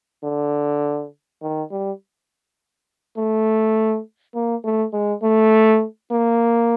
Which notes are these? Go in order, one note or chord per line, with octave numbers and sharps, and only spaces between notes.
D3
D#3
G3
A3
A#3
A3
G#3
A3
A#3